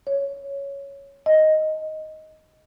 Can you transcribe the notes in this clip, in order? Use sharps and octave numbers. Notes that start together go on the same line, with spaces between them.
C#5
D#5